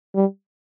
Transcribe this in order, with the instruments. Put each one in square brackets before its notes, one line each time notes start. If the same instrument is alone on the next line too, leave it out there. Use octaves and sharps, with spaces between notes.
[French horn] G3